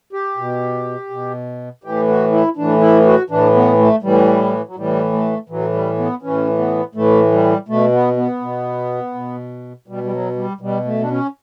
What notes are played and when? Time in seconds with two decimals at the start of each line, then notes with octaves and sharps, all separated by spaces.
0.13 G4
0.37 B2
1.10 B2
1.84 A2 E3 G4
2.08 F#4
2.32 E4
2.57 A2 E3 D4
2.81 E4
3.06 F#4
3.30 A2 E3 D4
3.55 B3
3.79 A3
4.02 A2 E3 G3
4.67 F#3
4.76 A2 E3 G3
5.13 A3
5.49 A2 E3 F#3
5.73 G3
5.98 B3
6.22 A2 E3 C#4
6.58 B3
6.95 A2 E3 A3
7.32 G3
7.68 B2 A3
7.92 B3
8.17 B3
8.41 B2
9.14 B2
9.88 B2 G3
10.04 G3
10.12 F#3
10.36 G3
10.61 B2 G3
10.85 A3
11.02 D4
11.10 C#4